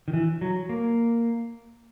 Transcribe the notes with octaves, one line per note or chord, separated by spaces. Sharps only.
D#3
E3
F#3
A#3